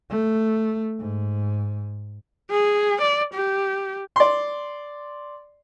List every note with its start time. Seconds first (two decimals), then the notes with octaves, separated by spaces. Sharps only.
0.10 A3
0.99 G#2
2.50 G#4
3.01 D5
3.34 G4
4.16 D5 C6